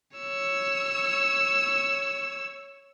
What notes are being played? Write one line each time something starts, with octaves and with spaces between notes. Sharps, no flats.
C#5 E6